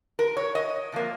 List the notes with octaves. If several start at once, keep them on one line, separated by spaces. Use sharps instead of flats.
A#4
C#5
D#5
C3 F3 A#3